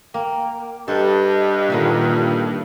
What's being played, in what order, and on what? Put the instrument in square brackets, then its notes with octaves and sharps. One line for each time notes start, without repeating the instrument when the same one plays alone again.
[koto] A#3 [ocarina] G5
[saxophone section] G2 [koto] A4 [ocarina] D#5
[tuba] A#2 [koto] D3 D#3 E4